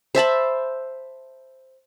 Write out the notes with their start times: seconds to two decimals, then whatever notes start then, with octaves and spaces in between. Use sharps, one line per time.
0.15 C5 E5 A5 B5